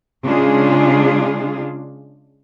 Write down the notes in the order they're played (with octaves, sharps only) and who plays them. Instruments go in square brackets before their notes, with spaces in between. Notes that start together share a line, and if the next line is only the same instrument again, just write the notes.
[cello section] C#3 G#3 D4 F4 G#4